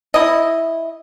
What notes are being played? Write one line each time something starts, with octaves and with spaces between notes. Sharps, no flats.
E4 D#5